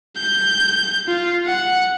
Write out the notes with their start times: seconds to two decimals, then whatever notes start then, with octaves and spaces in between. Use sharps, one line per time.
0.17 G6
1.08 F4
1.46 F#5